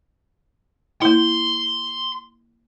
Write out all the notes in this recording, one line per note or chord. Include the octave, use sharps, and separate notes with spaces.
A#3 E4 C6